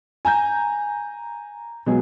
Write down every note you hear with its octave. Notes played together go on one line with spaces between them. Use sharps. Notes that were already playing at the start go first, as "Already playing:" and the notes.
G#5 A#5 G6
B2 F#3 G#3 B3 G#4